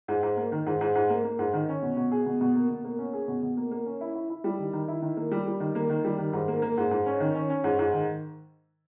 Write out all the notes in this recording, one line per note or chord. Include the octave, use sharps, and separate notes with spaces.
G#2
G#2
A#3
D#3
G#2
G#2
G#2
A#3
A#3
G#2
D#3
C#4
B2
B2
G#4
B2
B2
A#3
B2
A#3
C#4
G#4
B2
B2
A#3
A#3
C#4
E4
E4
E4
G3
D#3
D#3
E4
D#3
A#3
G3
G3
D#3
A#3
D#3
G3
D#3
G#2
A#3
A#3
G#2
G#2
C#4
D#3
C#4
C#4
G#2
G#2
D#3